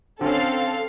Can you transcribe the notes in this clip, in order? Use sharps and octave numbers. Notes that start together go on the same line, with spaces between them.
D3 C4 C#4 A4 F5